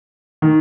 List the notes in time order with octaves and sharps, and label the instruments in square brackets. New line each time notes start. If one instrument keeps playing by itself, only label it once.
[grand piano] D#3